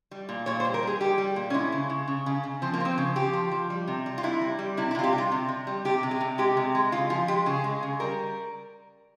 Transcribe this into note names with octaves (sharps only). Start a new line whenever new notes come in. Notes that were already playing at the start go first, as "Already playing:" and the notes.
G3
A#2
A#2 C#5
C5
G3
A#4
G3 G#4
G3 G4
G3
A#2
C#4
G#3 E4
C#3
C#3
C#3
C#3
C#3
F3 C4
A#3
F3 C4
C#3
F3 G4
F3
F3
G3
C3
G3
F4
C3 E4
G3
G3
C3 E4
E4
C3 F4
G4
G3
F4
C3
C3
G3
C3 G4
C3
G#4
C3
G#3 G4
C3
G#3
C#3 F4
F3 F4
G#3 G4
C#3 G#4
G#3
C#3
G3 A#4